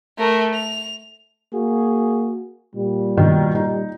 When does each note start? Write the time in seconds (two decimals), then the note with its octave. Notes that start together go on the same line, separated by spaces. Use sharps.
0.19 A3 A#4
0.55 F7
1.54 A#3 F#4 G#4
2.75 A#2 G3
3.17 B2 D#3
3.55 D#4